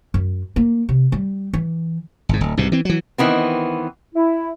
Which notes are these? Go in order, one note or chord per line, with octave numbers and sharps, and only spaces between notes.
F#2
A#3
C3
G3
E3
G#1 G#2
D1
C2 G#2 B2
E3 C4
E3 F#3
D#3 E3 B3 C4
E4